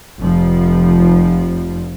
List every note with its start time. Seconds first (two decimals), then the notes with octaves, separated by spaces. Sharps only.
0.21 F1 F3